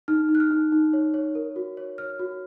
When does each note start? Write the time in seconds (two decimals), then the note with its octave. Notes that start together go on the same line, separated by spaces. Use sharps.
0.08 D#4 F6
0.29 D#4
0.35 F#6
0.40 F6
0.51 D#4
0.72 D#4
0.93 C#5
1.14 C#5
1.35 A#4
1.56 F#4
1.77 C#5
1.98 C#5 F6
2.19 F#4